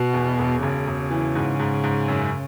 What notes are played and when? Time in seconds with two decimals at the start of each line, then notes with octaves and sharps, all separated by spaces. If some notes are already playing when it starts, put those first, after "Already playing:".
Already playing: B2 F#4
0.14 E2
0.39 E1
0.62 E1 C#3
0.87 E1
1.11 E3
1.35 G#2
1.59 G#2
1.84 G#2
2.08 F#2